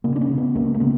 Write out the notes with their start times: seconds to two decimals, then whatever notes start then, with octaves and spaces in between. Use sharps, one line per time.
0.04 C#3 A#3
0.16 D4
0.21 C#4
0.29 C#3
0.38 B3
0.55 C#2 A#3
0.74 A#3
0.80 C#3 B3